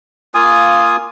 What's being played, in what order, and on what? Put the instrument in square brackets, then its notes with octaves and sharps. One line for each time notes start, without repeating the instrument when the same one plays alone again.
[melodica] A#3 F4 G#5 D#6